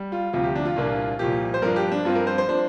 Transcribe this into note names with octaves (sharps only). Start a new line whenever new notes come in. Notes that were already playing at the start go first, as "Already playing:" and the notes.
Already playing: G3
F4
D2 C3 F3 F4
G4
D4
F4
C2 A#2 A#3 D4
C2 A#2 F3 G4
C5
G2 F3 D4 A#4
G4
D4
G2 F3 C4 F4
A#4
C5
C5
F3 D4 C5